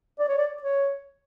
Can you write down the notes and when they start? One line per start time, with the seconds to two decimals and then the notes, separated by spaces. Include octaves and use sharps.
0.19 D5
0.28 C#5
0.38 D5
0.62 C#5